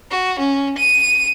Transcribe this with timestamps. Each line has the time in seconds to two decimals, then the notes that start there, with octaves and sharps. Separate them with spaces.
0.11 F#4
0.39 C#4
0.78 D#7